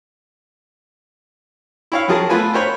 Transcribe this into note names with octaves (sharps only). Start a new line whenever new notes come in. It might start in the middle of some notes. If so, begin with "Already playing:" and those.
E4 C#5 F5
F2 F#3 F4 G#4 A#4 A5
A3 B3 F4 B4 G#5
A#4 C5 C#5 B5